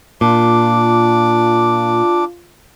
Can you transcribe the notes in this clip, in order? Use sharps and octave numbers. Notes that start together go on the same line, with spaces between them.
A#2 D4 F4 D6